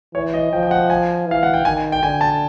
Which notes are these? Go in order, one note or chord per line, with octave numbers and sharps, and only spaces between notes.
E3 C#5
D#5
F3 G5
G5
F#5
G#5
E3 F5
F#5
G5
D#3 G#5
G5
D3 G#5
A5